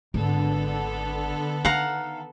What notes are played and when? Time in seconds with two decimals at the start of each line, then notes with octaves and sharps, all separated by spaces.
0.14 G#1 D3 B3 A4
1.65 D#3 F5 F#5 A#5